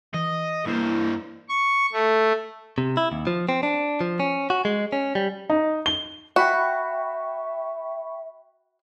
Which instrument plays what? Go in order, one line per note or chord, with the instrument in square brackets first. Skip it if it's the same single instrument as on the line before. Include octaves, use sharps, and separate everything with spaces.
[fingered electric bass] E3 [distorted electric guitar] D#5
[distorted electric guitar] G2 C5 [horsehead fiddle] A#3 [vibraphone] E4
[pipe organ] C#6
A3
[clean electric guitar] C3
E4
D#2
F3
C4
D4
F3
C#4
F#4
G#3
C#4
G3
[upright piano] D#4
G7
[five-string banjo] F#4 [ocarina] E5 [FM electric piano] G5 B5 C#6